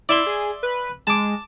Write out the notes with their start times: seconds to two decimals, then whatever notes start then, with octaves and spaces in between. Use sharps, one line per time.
0.09 E4 D5 E5 C6
0.26 G#4
0.63 B4
1.07 G#3 A5 D6